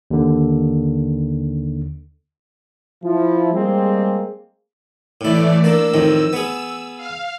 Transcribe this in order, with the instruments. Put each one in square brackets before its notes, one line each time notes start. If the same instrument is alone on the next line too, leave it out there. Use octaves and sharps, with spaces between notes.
[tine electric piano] D#2 D3
[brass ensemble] F3 E4
G3 G#3 A#3 C4 G4 G#4
[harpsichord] A2 E4 [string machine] E3 A3 D5
[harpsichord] A#3 D4 [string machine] E6
[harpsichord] F2 A2 D#3
B3 G#4
[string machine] F5